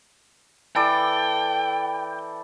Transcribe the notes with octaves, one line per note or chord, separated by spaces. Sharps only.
E3 A4 D5 G5